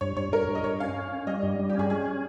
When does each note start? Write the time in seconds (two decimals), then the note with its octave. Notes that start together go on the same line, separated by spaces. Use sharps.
0.01 G2 C#5
0.17 G2 C#5
0.33 G2 A#4
0.48 G2
0.55 D#5
0.64 G2 C#5
0.80 C#4 F5
0.96 C#4
1.12 C#4
1.27 G3 D#5
1.43 G2
1.59 G3
1.70 G4
1.75 C#4 G#4
1.90 C#4 G#4